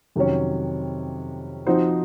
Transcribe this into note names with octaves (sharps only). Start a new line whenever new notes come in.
F2 C3 D#3 F#3 C#4
F3 C4 D#4 F#4 C5